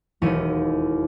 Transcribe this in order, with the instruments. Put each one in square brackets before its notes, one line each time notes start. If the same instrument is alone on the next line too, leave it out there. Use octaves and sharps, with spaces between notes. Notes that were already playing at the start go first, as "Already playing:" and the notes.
[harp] E1 D#2 E4 C#5 D#7